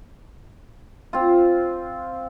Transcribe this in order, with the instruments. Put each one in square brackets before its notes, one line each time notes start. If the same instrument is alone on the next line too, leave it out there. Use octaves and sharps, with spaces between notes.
[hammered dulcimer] C4 F4